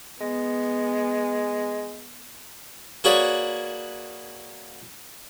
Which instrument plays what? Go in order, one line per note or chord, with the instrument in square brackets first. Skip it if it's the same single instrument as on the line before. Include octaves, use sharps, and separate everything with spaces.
[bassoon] G#3 [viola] B3
[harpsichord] A#3 F#4 G#4 B4 C#5 D5